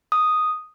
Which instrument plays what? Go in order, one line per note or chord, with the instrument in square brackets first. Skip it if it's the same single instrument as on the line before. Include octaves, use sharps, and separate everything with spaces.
[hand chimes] D#6